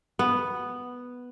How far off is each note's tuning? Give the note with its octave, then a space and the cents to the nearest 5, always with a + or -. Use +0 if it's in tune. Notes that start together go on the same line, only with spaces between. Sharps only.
B3 +0